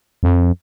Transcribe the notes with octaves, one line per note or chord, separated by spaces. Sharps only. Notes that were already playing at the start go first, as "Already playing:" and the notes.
F2